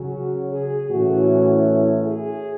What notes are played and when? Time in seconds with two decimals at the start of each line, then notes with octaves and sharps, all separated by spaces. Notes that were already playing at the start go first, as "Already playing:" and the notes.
Already playing: C#3 F#3 C#4 F#4
0.50 G#4
0.89 A2 E3 A3 C#4 F#4
2.05 G#4